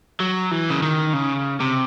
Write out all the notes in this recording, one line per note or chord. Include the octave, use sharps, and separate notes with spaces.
F#3
E3
C#3
D#3
C#3
C3